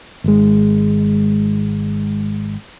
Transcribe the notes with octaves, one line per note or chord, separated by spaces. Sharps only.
G#1 G#3